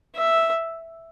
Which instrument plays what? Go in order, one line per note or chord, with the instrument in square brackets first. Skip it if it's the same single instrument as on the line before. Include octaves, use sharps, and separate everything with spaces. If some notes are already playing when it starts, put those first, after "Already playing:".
[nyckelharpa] E5